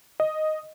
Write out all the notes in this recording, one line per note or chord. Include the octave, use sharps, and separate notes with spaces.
D#5